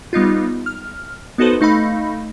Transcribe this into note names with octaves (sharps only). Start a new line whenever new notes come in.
G3 B3 D#4 F4
F6
B3 D#4 F#4 A4 B4 C5
A3 D#4 F5 B5